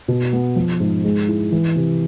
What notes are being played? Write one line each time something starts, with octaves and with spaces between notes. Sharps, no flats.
B2
B3
F3
G#2
G#3
E4
E3
C3